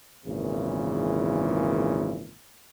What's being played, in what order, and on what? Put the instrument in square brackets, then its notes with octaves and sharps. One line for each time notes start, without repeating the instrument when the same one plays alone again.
[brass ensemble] G#1 E2 A#2 C#3 E3